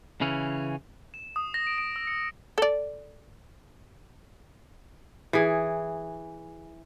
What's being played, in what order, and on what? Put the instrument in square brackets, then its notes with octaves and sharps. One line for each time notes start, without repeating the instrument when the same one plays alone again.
[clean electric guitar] C#3 E3 C#4
[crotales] E7
D#6
A#6
D7
D7
E6
C#7
[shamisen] A4 D5
[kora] E3 G#4